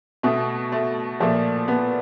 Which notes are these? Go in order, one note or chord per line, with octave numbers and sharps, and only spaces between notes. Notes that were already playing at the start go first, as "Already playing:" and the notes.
B2 A3
A3
A#2 F3 A3
B3